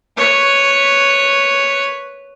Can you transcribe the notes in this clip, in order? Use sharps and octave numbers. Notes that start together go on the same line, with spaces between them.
B4 C#5